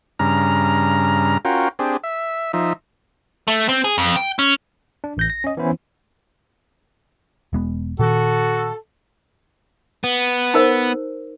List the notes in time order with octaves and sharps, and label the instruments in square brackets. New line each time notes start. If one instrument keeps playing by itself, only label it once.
[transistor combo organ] G2 C#3 A#5 F6
C#4 F4 F#4 A#4 G5
C4 D4 G4 G#4
E5
F3 D#4 E5
[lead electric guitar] A3
C4
G#4
F2
G5
C#4
[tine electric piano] D4
A1 G6 A#6
A#6
C#4 D#5
E3 B3 C#4 E4 C5
[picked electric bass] E1 G#3 B3
[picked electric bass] A#2 D#3 [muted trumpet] F#4 [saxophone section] A4
[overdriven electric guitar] B3
[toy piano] D#4 A#4 C5